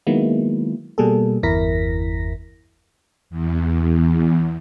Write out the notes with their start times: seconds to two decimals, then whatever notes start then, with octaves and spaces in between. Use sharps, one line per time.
0.07 D#3 F#3 G#3 A#3 B3 E4
0.98 B2 G3 A#3 G#4 A4
1.43 G1 E2 E4 A#4 A#6 B6
3.30 E2